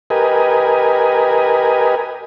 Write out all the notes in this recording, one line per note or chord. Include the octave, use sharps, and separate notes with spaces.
G4 A#4 B4 D#5 G#5